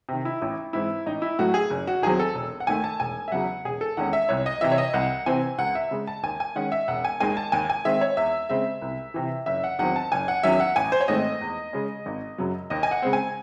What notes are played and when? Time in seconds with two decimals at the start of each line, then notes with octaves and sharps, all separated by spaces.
0.09 C3 D#3
0.25 E4
0.42 A1 E4
0.73 G#2 E3 C4 E4
1.06 A1 D#4
1.22 E4
1.39 A2 F#3 A3 F#4
1.54 G#4
1.71 F#1
1.87 F#4
2.02 E2 D#3 F#3 C4 G#4
2.20 A4
2.35 E1
2.60 F#5
2.67 D#2 D#3 A3 G#5
2.84 A5
3.00 E1 G#5
3.28 E5
3.32 E2 C#3 F#3 F#5
3.65 E1 G#4
3.81 A4
3.97 E2 D#3 G#3 C#4 F#5
4.13 E5
4.29 C2 C#5
4.46 D#5
4.61 C3 E3 E5
4.71 C#5
4.78 D#5
4.94 C2 F#5
5.26 C3 E3 C4 G#5
5.58 C#2 F#5
5.75 E5
5.91 C#3 G#3
6.07 A5
6.23 D#2 G#5
6.40 G#5
6.56 D#3 G#3 C#4 F#5
6.72 E5
6.88 E1 F#5
7.05 G#5
7.20 D#2 D#3 G#3 G#5
7.37 A5
7.52 D#2 G#5
7.70 G#5
7.85 D#3 G#3 C4 E5
8.01 C#5
8.17 E2 E5
8.50 C#3 G#3 C4 E5
8.82 C2
9.14 C3 E3
9.46 F#1 E5
9.64 F#5
9.79 E2 D#3 F#3 C4 F#5
9.96 A5
10.12 F#1 G#5
10.28 F#5
10.43 E2 D#3 F#3 C#4 E5
10.60 F#5
10.76 A1 G#5
10.92 C5
11.01 C#5
11.08 G#2 D#3 A3 C4 D#5
11.41 E2
11.73 C#3 G#3 C#4
12.06 G#1
12.38 F#2 C#3 F#3
12.70 D#2 D#5
12.83 G#5
12.91 F#5
13.02 C#3 G#3 C4
13.13 G#5